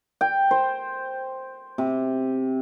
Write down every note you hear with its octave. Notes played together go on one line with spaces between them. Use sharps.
G5
C5
C3